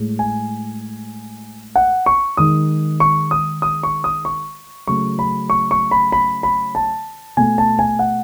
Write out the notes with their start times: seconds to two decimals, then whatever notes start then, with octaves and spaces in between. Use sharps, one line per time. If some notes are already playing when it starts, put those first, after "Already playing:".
Already playing: A2 G#3
0.19 G#5
1.76 F#5
2.06 C#6
2.37 D#3 G#3 D#6
3.00 C#6
3.31 D#6
3.62 D#6
3.83 C#6
4.04 D#6
4.25 C#6
4.87 C#3 F#3 A3 C#6
5.19 B5
5.50 C#6
5.71 C#6
5.91 B5
6.12 B5
6.43 B5
6.75 A5
7.37 B2 A3 G#5
7.58 A5
7.79 G#5
7.99 F#5